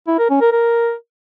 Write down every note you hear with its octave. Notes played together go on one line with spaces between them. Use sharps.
E4
A#4
C#4
A#4
A#4